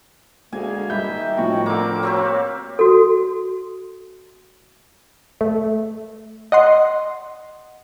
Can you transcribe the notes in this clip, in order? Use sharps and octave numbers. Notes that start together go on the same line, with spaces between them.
D2 G#3 A#3 G#4 G#5
D#3 G3 E5 B5 G6
A2 F3 F#4 G5
D3 A#3 C4 D6
A#3 C4 F#4 G4 C#5
F#4 A4
A3
D#5 F#5 C6